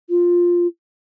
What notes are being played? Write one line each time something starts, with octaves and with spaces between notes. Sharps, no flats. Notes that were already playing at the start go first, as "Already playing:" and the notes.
F4